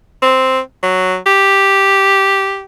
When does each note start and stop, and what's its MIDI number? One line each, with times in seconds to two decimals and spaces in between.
0.23 0.59 60
0.83 1.16 54
1.26 2.64 67